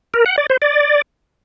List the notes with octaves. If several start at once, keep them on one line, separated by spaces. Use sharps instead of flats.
A#4
F#5
D5
C5
D5